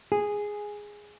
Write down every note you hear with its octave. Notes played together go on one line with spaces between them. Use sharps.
G#4